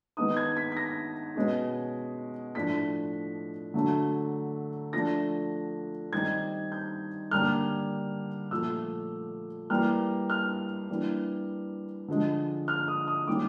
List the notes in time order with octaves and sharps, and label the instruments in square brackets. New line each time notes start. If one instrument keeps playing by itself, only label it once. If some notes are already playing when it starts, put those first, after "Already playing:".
[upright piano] D#3 G#3 B3 D#4 D#6
G#6
B6
B6
A#6
B2 G#3 C#4
A2 F3 A3 D4 B6
D3 F#3 A3
F3 A3 D4 A#6
D#3 G3 C4 D#4 G#6
G6
D3 G3 A#3 D4 F6
A#2 F3 A3 E6
E3 G3 A#3 F6
F6
E3 G3 A#3 D4
D3 F3 G#3
F6
D#6
D#6
D#3 G3 A#3 C#4 D6